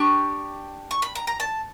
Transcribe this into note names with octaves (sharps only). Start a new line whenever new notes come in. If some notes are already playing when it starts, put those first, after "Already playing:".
Already playing: D4 G4 C#6
C#6
B5
A#5
A#5
A5